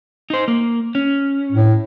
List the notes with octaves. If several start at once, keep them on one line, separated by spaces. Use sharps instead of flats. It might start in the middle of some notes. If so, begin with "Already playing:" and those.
D#4 C5
A#3
C#4
A2